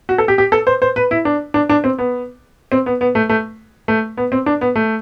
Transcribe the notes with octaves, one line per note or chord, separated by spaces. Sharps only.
F#4
A4
G4
G4
A4
C5
C5
B4
E4
D4
D4
D4
C4
B3
C4
B3
B3
A3
A3
A3
B3
C4
D4
B3
A3